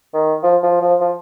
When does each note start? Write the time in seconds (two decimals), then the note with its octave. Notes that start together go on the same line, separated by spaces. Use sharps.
0.14 D#3
0.43 F3
0.63 F3
0.81 F3
1.01 F3